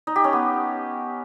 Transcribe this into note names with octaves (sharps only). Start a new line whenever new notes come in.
D#4
G4
C#4
B3